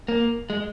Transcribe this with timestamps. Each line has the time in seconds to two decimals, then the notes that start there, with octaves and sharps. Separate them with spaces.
0.08 A#3
0.50 G#3